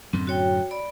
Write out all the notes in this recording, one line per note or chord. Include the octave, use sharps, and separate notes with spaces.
F#2 A2 D3 C4
F#4 C#5 G5
D5 B5